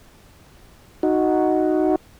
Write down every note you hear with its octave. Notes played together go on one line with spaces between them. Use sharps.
D#4 F#4